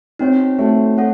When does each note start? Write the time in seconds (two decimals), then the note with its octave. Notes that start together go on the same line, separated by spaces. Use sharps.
0.19 C4 D#4 F#4 C#5
0.58 A3 D#4 F#4 C#5
0.98 A4 C#5 F#5